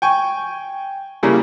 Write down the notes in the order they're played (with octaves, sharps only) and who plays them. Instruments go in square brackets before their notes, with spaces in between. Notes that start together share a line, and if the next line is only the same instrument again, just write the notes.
[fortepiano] G5 G#5 C#6
C#3 G3 A#3 E4